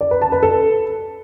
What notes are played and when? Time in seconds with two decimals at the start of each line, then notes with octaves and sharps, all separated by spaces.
0.01 D5
0.11 B4
0.22 A5
0.32 B4
0.43 A4